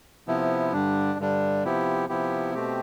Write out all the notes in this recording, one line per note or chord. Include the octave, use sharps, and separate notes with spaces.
C3 F3 B3 E4
G2 D3 G3 D4
G2 D3 G3 D4
C3 F3 B3 E4 G4
C3 F3 B3 E4 G4
B2 A3 C4 G4